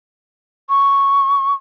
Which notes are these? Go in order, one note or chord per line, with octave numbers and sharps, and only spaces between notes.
C#6